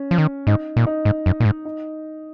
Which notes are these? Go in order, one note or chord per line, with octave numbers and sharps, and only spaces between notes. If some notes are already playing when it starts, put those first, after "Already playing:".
Already playing: C#4
F3
D#3
G#2 D#4
A#2
D#4
G#2
F#2
A#2
G#2
D#4